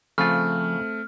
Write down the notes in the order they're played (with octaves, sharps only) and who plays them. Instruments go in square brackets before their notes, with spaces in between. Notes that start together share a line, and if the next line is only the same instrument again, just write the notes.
[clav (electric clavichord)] C#3 F4 [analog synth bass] F3 [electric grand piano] A3 C4 [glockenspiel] F6